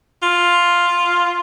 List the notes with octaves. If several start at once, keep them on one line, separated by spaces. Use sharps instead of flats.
F4